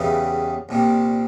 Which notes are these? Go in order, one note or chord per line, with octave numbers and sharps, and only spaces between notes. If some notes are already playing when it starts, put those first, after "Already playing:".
Already playing: E2 C#3 E3 G3
C2 A#2 G3